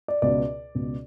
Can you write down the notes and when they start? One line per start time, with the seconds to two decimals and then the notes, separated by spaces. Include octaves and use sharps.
0.08 D5
0.22 C#2 B2 D5
0.75 C#2 B2